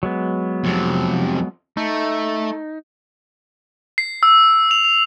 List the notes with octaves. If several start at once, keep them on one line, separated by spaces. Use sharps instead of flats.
F#3 G#3 B3
F2 C3
A3 D#4
C7
E6
F7
F7